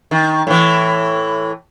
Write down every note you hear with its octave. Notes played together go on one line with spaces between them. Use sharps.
D#3
A2 E3